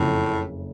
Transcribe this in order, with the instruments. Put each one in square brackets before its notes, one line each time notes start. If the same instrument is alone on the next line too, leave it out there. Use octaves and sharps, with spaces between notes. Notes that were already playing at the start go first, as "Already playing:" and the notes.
Already playing: [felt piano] F#1 F2 C#3 [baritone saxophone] A2